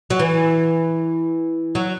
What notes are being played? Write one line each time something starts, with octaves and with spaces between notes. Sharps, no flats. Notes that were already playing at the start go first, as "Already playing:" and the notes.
F#3
E3
F#3